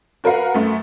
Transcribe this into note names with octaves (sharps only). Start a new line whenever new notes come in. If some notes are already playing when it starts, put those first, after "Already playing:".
F#4 A#4 B4 F5 F#5
F#2 A3